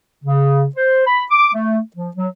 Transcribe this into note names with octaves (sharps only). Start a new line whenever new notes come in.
C#3
C5
B5
D6
A3
F3
F#3